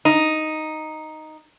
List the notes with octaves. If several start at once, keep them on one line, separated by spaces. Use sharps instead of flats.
D#4